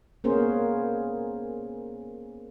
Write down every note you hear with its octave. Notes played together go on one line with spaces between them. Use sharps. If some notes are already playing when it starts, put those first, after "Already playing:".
A#3 B3 C#4 G#4 A#4 C5